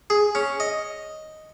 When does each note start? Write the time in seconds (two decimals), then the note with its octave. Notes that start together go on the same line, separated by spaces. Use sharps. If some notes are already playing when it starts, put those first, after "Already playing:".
0.10 G#4
0.35 C#4
0.60 D#5